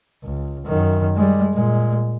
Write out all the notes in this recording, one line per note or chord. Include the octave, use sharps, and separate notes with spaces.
C#2
F#2 D#3
G3 G#3
A#2 G#3